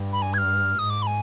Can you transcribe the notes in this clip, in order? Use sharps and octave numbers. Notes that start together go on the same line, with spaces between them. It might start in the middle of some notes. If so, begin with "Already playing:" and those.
Already playing: G2
B5
G#5
G#6
F6
G#2 D#6
D6
B5
G#5